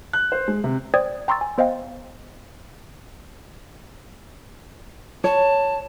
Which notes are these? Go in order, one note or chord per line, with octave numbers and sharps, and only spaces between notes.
F#6
C5
G#3
C3
C5 D5 G5 D#6 G#6
G5 A#5 C6 C#6 E6 A6
G#5
B3 C5 D#5 F5 G5
C#5 A5